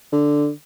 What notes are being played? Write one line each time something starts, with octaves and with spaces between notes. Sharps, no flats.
D3